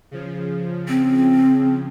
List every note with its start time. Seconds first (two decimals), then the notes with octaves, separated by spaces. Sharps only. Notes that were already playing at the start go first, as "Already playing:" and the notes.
0.11 C#3 F3
0.88 C4